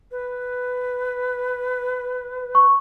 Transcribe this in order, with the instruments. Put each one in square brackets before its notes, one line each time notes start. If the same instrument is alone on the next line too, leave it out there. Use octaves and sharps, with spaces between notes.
[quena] B4
[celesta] C#6